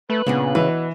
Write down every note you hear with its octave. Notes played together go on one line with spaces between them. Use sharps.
A3 B4
A#2 C#3 B3 D4
B2 E3 B4